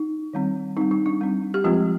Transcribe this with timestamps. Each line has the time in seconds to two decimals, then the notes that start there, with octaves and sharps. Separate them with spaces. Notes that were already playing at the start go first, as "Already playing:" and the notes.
Already playing: D#4
0.33 D#3 G3 C4
0.77 G3 C4 D#4
0.91 D#4
1.06 D4
1.21 G3 C4
1.54 G4
1.64 F3 G#3 C4 F4